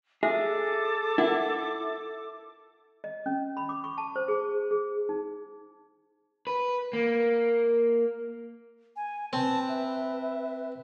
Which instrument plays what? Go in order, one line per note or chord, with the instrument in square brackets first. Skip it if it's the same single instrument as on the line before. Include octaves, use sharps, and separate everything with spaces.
[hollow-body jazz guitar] G#4 [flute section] A4 D6 [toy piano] E5
[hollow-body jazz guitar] E4 [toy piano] A#4 F#5
[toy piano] D#5
C#4
B5
D6
C#6
A5
C5
G#4
G#4
D#4
[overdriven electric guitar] B4
A#3
[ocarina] G#5
[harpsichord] C4 [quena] B4 [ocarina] A5
[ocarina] E5